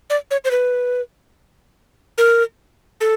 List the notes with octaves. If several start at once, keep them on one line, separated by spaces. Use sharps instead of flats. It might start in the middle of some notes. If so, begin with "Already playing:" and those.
D5
C#5
C5
B4
A#4
A4